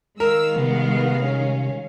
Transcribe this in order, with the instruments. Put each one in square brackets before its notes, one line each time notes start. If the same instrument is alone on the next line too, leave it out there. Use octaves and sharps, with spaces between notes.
[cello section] D#3 G#3 F5 [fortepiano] A#4 [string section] E6
[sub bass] C3 [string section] B3
[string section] C#4